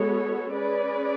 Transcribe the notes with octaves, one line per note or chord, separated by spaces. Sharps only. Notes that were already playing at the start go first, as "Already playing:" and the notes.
Already playing: G#3 B3 F#4 A4 C#5
C#4 G#4 B4 D5